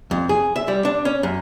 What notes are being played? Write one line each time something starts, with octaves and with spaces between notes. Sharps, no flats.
F2
G#4
E5
G3
D4
C#4
F#2